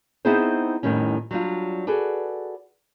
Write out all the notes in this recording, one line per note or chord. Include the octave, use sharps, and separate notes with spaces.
B3 C4 D#4 E4 G#4 C5
F2 A2 D#3 G3 C#4
F#3 G3 D4 F4
F#4 G#4 A4 B4 D5